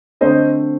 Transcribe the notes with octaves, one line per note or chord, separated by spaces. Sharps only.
D3 A3 C4 C5 D#5